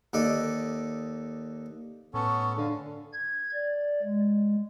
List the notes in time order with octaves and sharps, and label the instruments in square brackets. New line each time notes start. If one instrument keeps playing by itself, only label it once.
[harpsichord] D#2 A4 D5 D#5
[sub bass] A2 [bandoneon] B3 C#4 A4 [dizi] C#6
[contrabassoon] D3 [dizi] F5
[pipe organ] G#6
D5
G#3